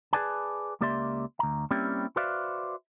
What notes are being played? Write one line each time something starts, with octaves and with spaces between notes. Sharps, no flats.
G#4 A#4 B4 D5 G#5 A5
C#2 A#3 G4 D5 E5 C6
D2 A#5
G3 A#3 C4 C#4 E4 G4
F#4 B4 C5 D5 E5 F5